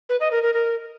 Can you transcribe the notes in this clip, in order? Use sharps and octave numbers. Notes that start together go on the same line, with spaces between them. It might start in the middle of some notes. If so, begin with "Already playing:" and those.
B4
D#5
A#4
A#4
A#4